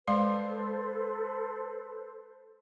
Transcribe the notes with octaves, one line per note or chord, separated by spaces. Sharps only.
G#3 A4 B4 C5 F5 C6